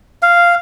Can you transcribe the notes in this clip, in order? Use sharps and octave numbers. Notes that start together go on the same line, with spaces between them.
F5